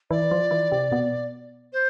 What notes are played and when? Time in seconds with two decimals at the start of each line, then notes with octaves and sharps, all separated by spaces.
0.11 E3 E4 D5
0.31 F3 F4
0.51 E3 E4
0.72 C3 C4
0.92 B2 B3
1.73 C5